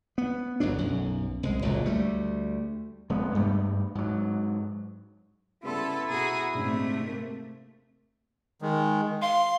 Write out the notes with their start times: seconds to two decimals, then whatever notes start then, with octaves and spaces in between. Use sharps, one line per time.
0.18 B3
0.60 G1 F2 F#3 D4
0.79 B1 F#2
1.43 C2 G#3
1.62 F#1 C#2 A#2 F#3
1.85 D2 G3 A3
3.10 F1 G#3 B3
3.35 G2 G3 A3
3.95 G#2 F#3
5.63 C#3 G3 B3 E4 A4 C6
6.08 B2 F#4 G#4 A#5
6.54 A#1 G#2 C3 A3
7.07 A#3
8.62 D#3 G#3
9.22 F5 C6